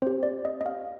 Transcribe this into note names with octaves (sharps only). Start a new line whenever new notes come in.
C4 G4 C5
D5
D#5
D#5
F5